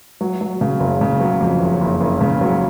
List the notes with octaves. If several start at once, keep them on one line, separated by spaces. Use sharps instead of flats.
F#3
F#3
C#3
F#1
C#3
F#3
F2
F#1
F#1
F#1
C#3
F#3